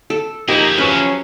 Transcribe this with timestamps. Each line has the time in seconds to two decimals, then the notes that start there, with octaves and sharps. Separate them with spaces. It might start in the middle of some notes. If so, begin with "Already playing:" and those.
0.10 A4
0.48 F3 A#3 D#4 E4 G4 G#4 A#5
0.78 F3 F#3 C#4 B4